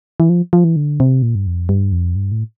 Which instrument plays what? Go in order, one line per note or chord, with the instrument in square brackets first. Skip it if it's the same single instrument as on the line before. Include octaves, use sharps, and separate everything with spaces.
[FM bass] E3
F3
F3
E3
D3
C3
A#2
G2
F2
G2
F2
G2
A2